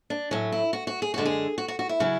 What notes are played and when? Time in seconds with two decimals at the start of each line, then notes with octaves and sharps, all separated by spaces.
0.10 D4
0.31 A2 F#3 C#4
0.52 E4
0.73 F#4
0.87 F#4
1.02 G#4
1.14 F#2 D3 G#3 F#4
1.25 G#4
1.58 F#4
1.68 F#4
1.79 F#4
1.89 E4
2.00 C#3 F#3